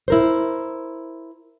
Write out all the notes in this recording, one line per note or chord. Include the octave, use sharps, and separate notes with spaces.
E4 A#4 C5